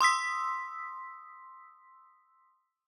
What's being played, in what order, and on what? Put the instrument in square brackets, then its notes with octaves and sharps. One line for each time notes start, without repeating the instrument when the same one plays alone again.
[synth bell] C6 D#6 E6 B6